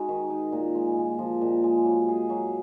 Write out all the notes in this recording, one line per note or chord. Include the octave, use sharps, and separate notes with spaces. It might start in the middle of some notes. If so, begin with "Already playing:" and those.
Already playing: G#3 D#4 F#4
D#3
D#4
A#2
G#3
A#2
F3
A#2
G#3
F#3
G#4
F#3